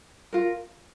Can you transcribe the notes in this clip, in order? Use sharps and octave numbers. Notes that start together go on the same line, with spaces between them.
F4 A#4